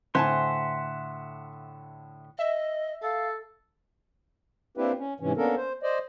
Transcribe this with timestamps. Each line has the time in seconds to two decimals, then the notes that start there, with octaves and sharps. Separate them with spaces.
0.15 A2 D3 C5 E5 F#5 G#5 A5 C6
2.39 D#5 E5
3.03 A4 F5
4.77 A#3 C4 D4 E4 G4 B4
4.99 C#4
5.20 G#2 C3 E3 C#4
5.37 A#3 B3 C#4 D4 A4 A#4
5.57 C5
5.83 C5 D5 D#5